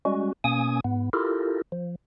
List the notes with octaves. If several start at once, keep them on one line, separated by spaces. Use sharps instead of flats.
G3 G#3 C#4 F#4
B2 A#3 C#4 G#5 D#6
G#2 B3
E4 F4 G4 A4 A#4
F3